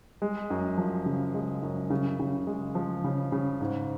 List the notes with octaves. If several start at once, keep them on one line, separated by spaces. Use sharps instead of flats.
G#3
F#2
F3
C#3
G#3
F#2
C#3
C#3
G#3
F3
C#3
C#3
G#2